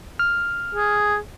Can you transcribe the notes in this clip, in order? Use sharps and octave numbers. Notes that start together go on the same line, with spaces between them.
F6
G#4